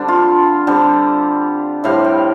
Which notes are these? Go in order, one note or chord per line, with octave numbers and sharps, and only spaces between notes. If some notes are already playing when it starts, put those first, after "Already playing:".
Already playing: D3 G3 C4 D4
F4
D3 G3 C4
A2 G3 C4 F5
G5